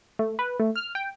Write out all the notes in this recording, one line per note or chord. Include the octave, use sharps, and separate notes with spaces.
A3
B4
A3
F6
G5